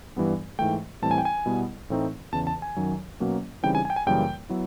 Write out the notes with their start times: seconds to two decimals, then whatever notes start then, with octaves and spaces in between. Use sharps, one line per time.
0.16 G2 E3 G3 B3 D4
0.59 G#2 E3 A3 G5
1.02 A2 E3 G3 C4 E4 A5
1.11 G#5
1.18 G5
1.25 G#5
1.46 B2 G3 B3 E4
1.90 A2 E3 A3 C4 D#4
2.32 E2 C#3 E3 A5
2.47 A5
2.62 G#5
2.77 F#2 D#3 F#3
3.20 B2 F#3 A#3 C#4
3.63 C#3 E3 G3 C4 D#4 G5
3.75 G#5
3.85 G#5
3.90 G5
3.96 G#5
4.06 F#2 C#3 E3 G3 A#3 G5
4.49 F#3 B3 E4